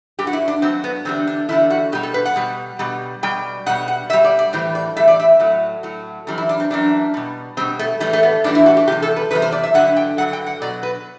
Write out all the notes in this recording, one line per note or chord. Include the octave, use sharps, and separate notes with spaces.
G2 F#3 G4
F#4
E4
D4
G2 F#3 C4
B3
E2 D3 G3 C4
D4
E2 D3 G3 E4
F#4
B2 G3 G4
A4
B4
F#5
B2 G3
B2 G3
B2 G3 G5
B2 G3 F#5
F#5
B2 G3 E5
D5
D5
A2 E3 G3 C5
D5
A2 E3 G3 E5
D5
E5
A2 F#3
A2 F#3
F#2 E3 G3
E4
D4
C4
F#2 E3 G3 D4
B2 G3
B2 G3 C4
A3
A2 E3 G3 A3
A3
B3
A2 E3 G3 D4
E4
F#4
G4
E2 C3 G3 G4
A4
B4
E2 C3 G3 B4
C5
D5
E5
G2 D3 F#3 F#5
G5
G2 D3 F#3 F#5
G5
F#5
B2 F#3 D5
B4